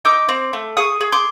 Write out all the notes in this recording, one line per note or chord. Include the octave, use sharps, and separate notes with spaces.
D#4 D6 E6
C4
A3
G#4 C#6 D#6
G#4
C6 D6